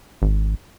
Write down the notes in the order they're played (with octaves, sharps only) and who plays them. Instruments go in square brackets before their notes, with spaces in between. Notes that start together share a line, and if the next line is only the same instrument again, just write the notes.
[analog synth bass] G#1